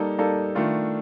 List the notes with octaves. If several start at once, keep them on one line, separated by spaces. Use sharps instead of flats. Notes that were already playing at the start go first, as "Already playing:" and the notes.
Already playing: G3 A#3 D#4 A4
G3 A#3 D#4 A4
D#3 A3 D4 F4